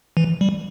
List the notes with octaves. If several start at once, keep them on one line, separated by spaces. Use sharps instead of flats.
E3
G3